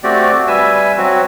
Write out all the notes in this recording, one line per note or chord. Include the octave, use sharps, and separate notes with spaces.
A3 C4 F#4 G4 D5
G3 B4 E5 G#5 E6
F#3 C4 F#4